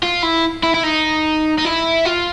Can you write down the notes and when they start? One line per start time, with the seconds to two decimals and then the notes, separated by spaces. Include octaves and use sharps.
0.03 F4
0.23 E4
0.63 E4
0.74 E4
0.84 D#4
1.58 D#4
1.65 E4
2.05 F4